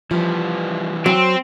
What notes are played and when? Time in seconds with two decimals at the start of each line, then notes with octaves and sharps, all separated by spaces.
0.11 E3 F3 G3 B4
1.06 F#3 C4